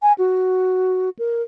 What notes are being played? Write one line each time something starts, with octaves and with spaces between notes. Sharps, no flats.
G#5
F#4
A#4